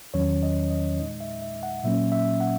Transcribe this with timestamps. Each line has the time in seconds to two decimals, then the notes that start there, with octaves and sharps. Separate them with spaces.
0.14 E2 D#3 F#3 C#4 C#5
0.43 D#5
0.70 D#5
0.99 A#2 G#3 D#4 D#5
1.20 E5
1.42 E5
1.63 F#5
1.84 A#2 F#3 A#3 C#4 E5
2.12 E5
2.41 F#5